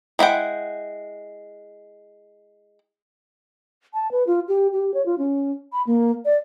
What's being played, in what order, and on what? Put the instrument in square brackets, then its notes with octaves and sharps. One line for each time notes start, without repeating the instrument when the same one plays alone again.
[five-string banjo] G#3 E4 F#5 G5
[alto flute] A5
B4
F4
G4
G4
C#5
F4
C#4
B5
A#3
D5